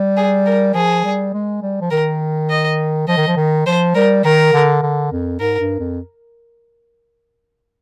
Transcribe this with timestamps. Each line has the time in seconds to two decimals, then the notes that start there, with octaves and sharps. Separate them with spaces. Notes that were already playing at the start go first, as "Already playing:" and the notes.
Already playing: G3
0.17 G#4
0.46 A#4
0.75 F3 G#4
1.04 G3
1.33 G#3
1.62 G3
1.81 F3
1.91 D#3 A#4
2.50 D#5
3.08 F3 D#5
3.17 D#3
3.27 F3
3.36 D#3
3.66 F3 C5
3.95 G3 A#4
4.24 D#3 A#4
4.53 D3
4.82 D3
5.12 F2
5.40 G#2 A#4
5.60 G2
5.79 F2